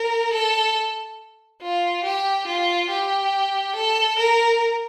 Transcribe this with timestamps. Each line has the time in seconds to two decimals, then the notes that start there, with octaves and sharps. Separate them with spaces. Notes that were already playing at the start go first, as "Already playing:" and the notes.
Already playing: A#4
0.33 A4
1.62 F4
2.04 G4
2.47 F4
2.90 G4
3.76 A4
4.19 A#4